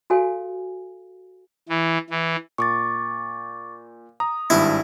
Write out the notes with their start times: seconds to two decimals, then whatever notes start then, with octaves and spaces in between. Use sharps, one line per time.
0.10 F#4 G4 A4 C#5 F5 G#5
1.69 E3
2.10 E3
2.58 A#2 C#6 D6 A6
4.20 A#5 D#6
4.50 G#1 G2 D4 E4